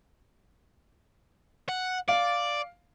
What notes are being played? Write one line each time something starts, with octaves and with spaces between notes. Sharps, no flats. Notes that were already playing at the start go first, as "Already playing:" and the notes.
F#5
D5 F5